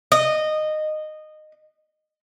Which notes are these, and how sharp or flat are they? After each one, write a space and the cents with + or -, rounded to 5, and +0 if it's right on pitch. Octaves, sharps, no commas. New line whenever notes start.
D#5 -15